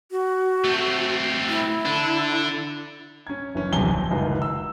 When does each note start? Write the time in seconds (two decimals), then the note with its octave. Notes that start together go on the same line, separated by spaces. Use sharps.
0.11 F#4
0.64 A3 C4
1.49 E4
1.86 D3 D4
3.27 C#4 G#6
3.55 F#1 E3 C#4
3.72 D#1 B1 C3 G#5 G7
3.91 F2
4.10 F#1 C#2 F#2 D#3
4.42 E6